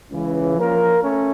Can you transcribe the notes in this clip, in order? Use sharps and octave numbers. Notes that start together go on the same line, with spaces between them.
C#2 C#3 E3
F3 A#3 C#4 F4 A#4
A3 C#4